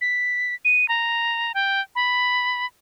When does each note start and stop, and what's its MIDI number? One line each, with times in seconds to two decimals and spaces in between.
0.01 0.55 95
0.65 0.88 99
0.89 1.52 82
1.54 1.81 79
1.95 2.66 83